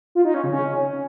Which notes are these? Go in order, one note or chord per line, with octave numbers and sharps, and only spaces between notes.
F4
D#4
C#4
C#3
C#4